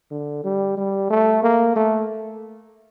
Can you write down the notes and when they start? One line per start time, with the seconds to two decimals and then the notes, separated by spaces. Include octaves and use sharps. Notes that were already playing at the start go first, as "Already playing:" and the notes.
0.11 D3
0.44 G3
0.77 G3
1.10 A3
1.43 A#3
1.76 A3